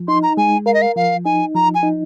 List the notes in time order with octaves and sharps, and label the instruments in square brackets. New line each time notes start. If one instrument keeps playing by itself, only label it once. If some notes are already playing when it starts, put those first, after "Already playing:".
Already playing: [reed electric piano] F3
[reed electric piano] D#4 [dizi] C6
[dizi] A#5
[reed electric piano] G#3 [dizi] G#5
[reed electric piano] A#4 [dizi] F5
[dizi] D#5
F5
[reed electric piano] F3 [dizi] F5
[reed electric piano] D#4 [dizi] G#5
[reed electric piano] F3 [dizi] A#5
[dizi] G#5
[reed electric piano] D#4